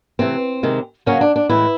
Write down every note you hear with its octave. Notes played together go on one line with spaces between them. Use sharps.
C3 E3 A3 C4
C3 D#3 G#3
C#3 F#3 A#3 C#4
D4
D4
A2 E3 G#3 E4